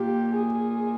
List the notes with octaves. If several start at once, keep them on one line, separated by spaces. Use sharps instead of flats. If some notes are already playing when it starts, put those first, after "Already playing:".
Already playing: A#2 G4
G#4